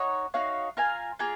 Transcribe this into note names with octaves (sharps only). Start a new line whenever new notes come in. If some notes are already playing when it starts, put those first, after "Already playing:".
Already playing: D#4 F#4 C#5
D#4 F#4 C#5 F5
F4 A#4 F5 G#5
A#3 F4 G#4